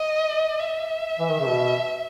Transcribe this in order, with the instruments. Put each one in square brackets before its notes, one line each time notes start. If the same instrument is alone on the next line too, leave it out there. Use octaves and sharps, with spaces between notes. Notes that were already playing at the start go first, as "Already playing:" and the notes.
Already playing: [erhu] D#5
E5
[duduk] E3
D#3
C#3
B2